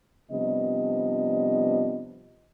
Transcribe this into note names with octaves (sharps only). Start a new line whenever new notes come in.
C3 F3 G3 B3 D4 D#5